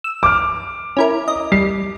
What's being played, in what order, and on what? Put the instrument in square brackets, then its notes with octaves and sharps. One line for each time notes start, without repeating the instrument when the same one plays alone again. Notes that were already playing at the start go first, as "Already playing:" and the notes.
[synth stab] E6
[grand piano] D6 F6
[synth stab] C#4 E4 A#4
D#5
[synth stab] G3 [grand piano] C7